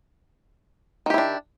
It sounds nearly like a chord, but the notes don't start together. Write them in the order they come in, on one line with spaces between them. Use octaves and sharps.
D#3 G4 E4 D4